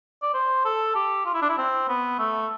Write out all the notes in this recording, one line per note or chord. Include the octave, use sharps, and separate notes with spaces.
D5
C5
A4
G4
F4
E4
D4
E4
C4
B3
A3